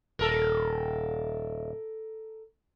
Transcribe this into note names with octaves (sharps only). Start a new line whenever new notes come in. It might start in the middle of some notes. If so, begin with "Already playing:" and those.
D#1 A4 A#4